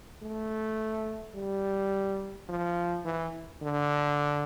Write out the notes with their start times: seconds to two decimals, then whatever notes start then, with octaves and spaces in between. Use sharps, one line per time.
0.22 A3
1.35 G3
2.49 F3
3.05 E3
3.62 D3